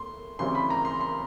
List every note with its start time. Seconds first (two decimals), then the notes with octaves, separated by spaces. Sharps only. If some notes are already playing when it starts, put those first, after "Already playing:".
Already playing: A3 C6
0.39 D2 C#3 E3 G3 C4 C6
0.55 B5
0.70 A#5
0.85 C6
1.01 C6